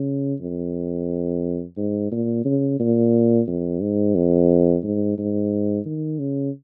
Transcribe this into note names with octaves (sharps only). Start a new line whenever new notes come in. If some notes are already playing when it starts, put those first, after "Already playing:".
Already playing: C#3
F2
G#2
A#2
C#3
A#2
F2
G#2
F2
G#2
G#2
D#3
C#3